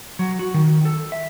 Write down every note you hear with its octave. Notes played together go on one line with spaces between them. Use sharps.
F#3
F#4
D#3
A4
E5